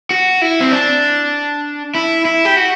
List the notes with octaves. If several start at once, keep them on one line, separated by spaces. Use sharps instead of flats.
F#4
E4
C4
D4
E4
E4
G4
F#4